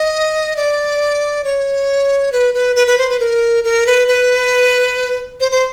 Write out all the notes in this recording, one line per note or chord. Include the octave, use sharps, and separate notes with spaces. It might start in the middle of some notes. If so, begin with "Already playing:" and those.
Already playing: D#5
D5
C#5
B4
B4
B4
B4
C5
B4
A#4
A#4
B4
B4
C5
C5